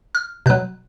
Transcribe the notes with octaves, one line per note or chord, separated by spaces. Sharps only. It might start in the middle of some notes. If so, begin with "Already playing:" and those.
F6
B2 F#3 F#6